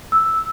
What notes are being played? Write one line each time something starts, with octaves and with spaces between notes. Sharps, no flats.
E6